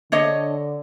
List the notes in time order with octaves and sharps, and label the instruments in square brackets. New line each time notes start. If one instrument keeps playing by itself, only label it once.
[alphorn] D3 [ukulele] D4 C#5 D#5